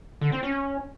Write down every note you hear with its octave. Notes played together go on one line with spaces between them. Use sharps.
D3
C4
C#4